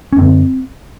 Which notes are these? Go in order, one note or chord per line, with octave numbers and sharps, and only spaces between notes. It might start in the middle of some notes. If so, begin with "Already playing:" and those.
C#4
F#2 D3 C4